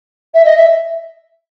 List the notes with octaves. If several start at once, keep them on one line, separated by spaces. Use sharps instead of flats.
E5
D#5
E5